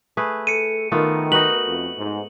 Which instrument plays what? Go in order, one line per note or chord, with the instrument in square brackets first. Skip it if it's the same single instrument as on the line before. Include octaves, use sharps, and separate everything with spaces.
[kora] A3 G#4 B4
[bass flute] A4 [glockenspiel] C#7 D#7
[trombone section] D#3 [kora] A3 B3 F4 [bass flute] A#4
[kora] D#4 F#4 B4 [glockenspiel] F#7
[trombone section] F2
G#2